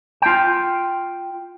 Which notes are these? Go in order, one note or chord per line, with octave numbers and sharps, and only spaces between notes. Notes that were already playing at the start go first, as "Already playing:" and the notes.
F4 G5